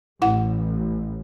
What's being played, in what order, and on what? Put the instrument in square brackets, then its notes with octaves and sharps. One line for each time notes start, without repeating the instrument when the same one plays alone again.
[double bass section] A1 [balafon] E4 F#5